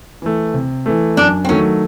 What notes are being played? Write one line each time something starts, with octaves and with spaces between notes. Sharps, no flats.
E3 A3
C3
E3 A3
F#2 D4
C4
D#3 F#3 A3 C#4